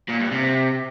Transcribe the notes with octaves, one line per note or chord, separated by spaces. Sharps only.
A#2
G2
C3